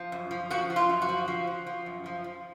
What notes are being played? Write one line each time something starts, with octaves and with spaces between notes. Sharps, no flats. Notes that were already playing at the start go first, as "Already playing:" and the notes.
Already playing: F3
F#2
F3
F3 F#4
F3
F4
F#2
F#4
F3
F3
F3
F3
F#2
F3
F3